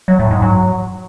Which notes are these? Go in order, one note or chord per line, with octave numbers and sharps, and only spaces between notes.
F#3
A2
G#2
F#3